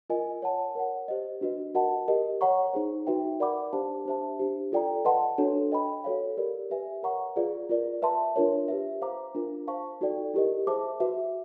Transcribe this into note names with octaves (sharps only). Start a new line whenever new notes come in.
F4 A#4 D#5 G#5
C#5 F#5 A5
A#4 C#5 F#5
G4 C5 D#5
D4 F#4 B4 D#5
F#4 A#4 D#5 F#5 A5
G4 A#4 D#5
C#5 F#5 A#5 C#6
D#4 G#4 C5
D#4 F#4 B4 E5 G5
A#4 D5 F#5 B5 D6
D4 G4 C5 F5 A5
D4 G4 C5 E5 A5
D4 G4 C5
F4 A4 D5 G5 A#5
B4 D#5 F#5 A5 C6
D4 F#4 A4 C#5
B4 D#5 G5 B5
F#4 A4 C#5 F5
G4 A#4 D5
G4 B4 E5 G#5
A#4 C#5 F#5 A#5 C#6
F4 G#4 B4 D5 F5
F4 A#4 D5
B4 E5 A5 C6
D4 F4 A#4 C#5
G4 B4 E5
C5 F5 A#5 D6
D4 F4 A#4
C5 F5 A5 C#6
D#4 F#4 A4 D5 G5
E4 G4 A#4 D#5
G#4 C5 E5 A5 D6
F#4 B4 E5